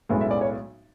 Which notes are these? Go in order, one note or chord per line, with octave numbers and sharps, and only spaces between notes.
B1 A2 G#3 B3
E5
D5
C#5